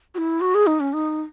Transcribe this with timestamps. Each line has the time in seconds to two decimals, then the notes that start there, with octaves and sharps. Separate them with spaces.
0.15 F#4
0.18 E4
0.41 F#4
0.54 G#4
0.67 D#4
0.80 C#4
0.93 D#4